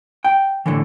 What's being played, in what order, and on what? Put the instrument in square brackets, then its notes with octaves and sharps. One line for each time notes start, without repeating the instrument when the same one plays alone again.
[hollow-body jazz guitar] G5
A2 D3 E3